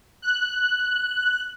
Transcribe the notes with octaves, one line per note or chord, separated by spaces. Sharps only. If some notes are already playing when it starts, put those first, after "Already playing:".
F#6